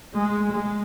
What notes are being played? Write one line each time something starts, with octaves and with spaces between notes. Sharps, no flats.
G#3
G#3